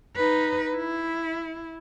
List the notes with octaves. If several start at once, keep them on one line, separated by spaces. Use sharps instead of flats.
D#4 B4
E4